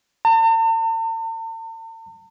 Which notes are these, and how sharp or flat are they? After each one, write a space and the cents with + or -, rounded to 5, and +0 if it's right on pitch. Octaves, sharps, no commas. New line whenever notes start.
A5 +45